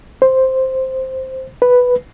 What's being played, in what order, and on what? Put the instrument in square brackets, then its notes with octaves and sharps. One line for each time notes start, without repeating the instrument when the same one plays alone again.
[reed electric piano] C5
B4